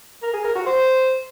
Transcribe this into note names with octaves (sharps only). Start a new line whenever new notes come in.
A#4
G#4
A#4
F#4
C5